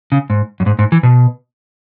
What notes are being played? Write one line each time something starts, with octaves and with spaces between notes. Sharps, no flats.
C#3
G#2
F#2
G#2
G#2
E3
B2